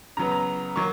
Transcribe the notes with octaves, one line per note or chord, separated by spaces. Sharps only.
C#3 F#3 B3 A#5
A#5
F#3 A#3 C#6